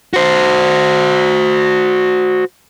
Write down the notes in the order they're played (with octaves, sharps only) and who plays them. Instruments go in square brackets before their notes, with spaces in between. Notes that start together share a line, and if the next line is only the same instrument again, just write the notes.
[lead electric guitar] F#4 C5